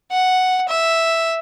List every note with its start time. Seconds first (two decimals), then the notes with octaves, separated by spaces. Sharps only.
0.11 F#5
0.69 E5